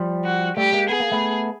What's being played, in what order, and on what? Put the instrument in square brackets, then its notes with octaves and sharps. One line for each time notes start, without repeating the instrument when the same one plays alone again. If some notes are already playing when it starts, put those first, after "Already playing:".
Already playing: [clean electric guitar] F3 G3
[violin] F#4
[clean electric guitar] G3 A3 [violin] G4
[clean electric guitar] G#3 A#3
[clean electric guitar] B3 [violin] G#4
[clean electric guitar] A#3
A3 B3